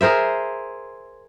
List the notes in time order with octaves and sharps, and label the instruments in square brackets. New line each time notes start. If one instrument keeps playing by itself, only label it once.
[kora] G#4 A#4 C5 E5